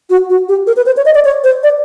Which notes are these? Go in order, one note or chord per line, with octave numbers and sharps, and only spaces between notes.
F#4
F#4
G4
A#4
B4
C5
C#5
D#5
D5
C#5
C5
D5